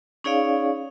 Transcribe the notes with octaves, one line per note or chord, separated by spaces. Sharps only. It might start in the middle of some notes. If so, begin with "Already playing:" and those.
C#4 D#4 G#4 C#5 D5 F5